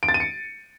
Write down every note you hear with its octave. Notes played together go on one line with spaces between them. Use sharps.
D7
A6
D#7
C#7